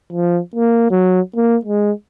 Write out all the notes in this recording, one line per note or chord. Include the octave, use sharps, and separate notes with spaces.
F3
A#3
F#3
A#3
G#3